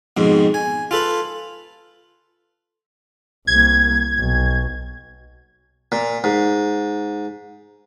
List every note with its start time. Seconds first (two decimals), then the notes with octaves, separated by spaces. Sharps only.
0.17 F2 G#2 B2
0.54 G#5
0.91 F4 A4 B4
3.47 C2 A#3 G#6
4.18 B1
5.92 A#2
6.24 G#2